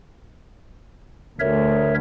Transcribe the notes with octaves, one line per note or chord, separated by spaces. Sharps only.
D2 A#4 C#5 E5